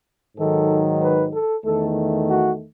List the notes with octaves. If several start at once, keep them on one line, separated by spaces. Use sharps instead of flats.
G#2 D#3 F#3 A4
B4
A4
E2 D#3 A3 A4
F#4